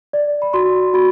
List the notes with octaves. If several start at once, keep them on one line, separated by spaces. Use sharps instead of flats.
D5
B5
F#4 C6
F#4 B5